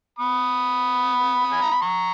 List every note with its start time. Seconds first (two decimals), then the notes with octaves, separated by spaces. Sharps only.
0.19 B5 D#6
1.52 G#5
1.62 A#5
1.71 B5
1.82 A#5 C#6